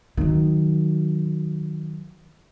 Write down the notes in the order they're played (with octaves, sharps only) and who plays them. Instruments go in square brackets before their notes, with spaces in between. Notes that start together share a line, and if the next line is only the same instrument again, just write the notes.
[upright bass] D#3 F#3